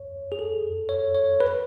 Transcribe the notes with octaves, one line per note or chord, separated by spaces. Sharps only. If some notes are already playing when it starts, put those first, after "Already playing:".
Already playing: C#5
G#4
A4
C#5
C#5
B4